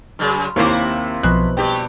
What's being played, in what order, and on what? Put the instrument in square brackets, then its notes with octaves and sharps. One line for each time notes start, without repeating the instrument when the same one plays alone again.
[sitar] F#2 C#3 [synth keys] F6
[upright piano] D#2 D6 [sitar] C3 E4 [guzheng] A#3 C4 C#5
[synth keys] B1 F3 [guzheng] B2 [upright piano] F#6
[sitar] G2 G4 [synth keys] G5